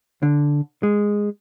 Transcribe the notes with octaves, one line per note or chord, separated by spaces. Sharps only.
D3
G#3